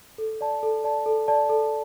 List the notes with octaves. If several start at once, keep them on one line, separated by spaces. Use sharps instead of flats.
A4
D5 A5
A4
D5 A5
A4
D5 A5
A4